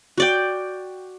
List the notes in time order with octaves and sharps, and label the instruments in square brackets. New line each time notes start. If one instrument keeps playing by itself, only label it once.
[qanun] F#4 D5 G5